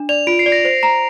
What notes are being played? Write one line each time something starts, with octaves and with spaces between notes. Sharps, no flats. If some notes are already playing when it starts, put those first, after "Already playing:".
Already playing: D4
D5 F7
F4 D7
C7
D5
A#6
C5
A#5